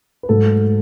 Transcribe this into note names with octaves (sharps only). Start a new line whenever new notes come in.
B4
G#2 F#3 A3 A4